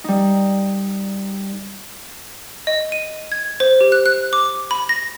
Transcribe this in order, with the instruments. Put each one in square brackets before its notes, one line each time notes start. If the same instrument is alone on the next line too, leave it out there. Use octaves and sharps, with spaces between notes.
[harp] G3 D#4
[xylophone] D#5
D#7
G#6
C5
G4
F#6
F#6
D6
B5
A#6